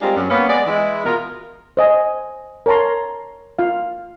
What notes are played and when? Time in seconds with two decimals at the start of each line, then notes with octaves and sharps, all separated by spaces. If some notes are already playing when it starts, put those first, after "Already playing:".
0.01 G3 G#3 C4 D4 F4 A#4
0.17 F#2
0.30 A#3 B3 C#4
0.50 G#3 B3 D5
0.67 E3 G#3 E4
1.06 B2 B3 F4 A#4
1.77 C5 D#5 G#5
2.66 A#4 C#5 A5 A#5 C6
3.59 F4 F5